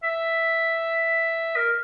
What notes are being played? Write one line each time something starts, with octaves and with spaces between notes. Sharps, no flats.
E5
A#4